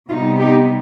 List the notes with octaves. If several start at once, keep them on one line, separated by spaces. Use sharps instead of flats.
C3 G3 B3 D#4 F4
D#4 G4